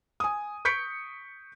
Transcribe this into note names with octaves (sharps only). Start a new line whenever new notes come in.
G#5 D#6
C#6 G6 B6 C#7 D7